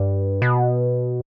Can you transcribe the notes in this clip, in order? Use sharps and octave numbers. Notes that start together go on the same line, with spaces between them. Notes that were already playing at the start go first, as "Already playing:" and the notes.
Already playing: G2
B2